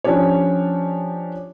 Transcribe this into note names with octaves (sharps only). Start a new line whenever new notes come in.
F3 C#4 D4 G4 C#5